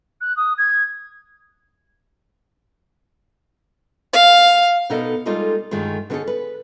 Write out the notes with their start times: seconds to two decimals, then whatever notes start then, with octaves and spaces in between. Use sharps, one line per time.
0.20 F#6
0.36 D#6
0.57 G#6
4.13 F5
4.90 B2 B3 D#4 A4 A#4 D#5
5.26 G3 G#3 A#3 D#4 F4 A4
5.71 D2 G2 D#3 G#3 A3 F4
6.10 D3 B3 C#4 D#4 G#4 A4
6.27 B4